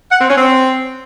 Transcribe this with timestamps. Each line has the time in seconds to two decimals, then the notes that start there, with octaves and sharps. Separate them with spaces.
0.12 F#5
0.20 C4
0.29 C#4
0.38 C4